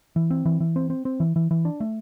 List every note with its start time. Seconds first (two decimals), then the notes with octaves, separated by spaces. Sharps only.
0.16 E3
0.30 C4
0.45 E3
0.60 E3
0.76 C4
0.90 C4
1.05 C4
1.20 E3
1.36 E3
1.51 E3
1.65 D4
1.80 A3